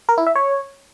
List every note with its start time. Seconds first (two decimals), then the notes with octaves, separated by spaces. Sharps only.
0.09 A#4
0.18 E4
0.27 E5
0.35 C#5